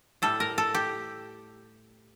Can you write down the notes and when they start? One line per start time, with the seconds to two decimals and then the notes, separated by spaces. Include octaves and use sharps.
0.22 A2 G3 A4
0.40 A#4
0.58 A4
0.75 G4